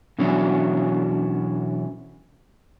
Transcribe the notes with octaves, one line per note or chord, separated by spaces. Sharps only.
B2 E3 F#3 C#4 D4 E4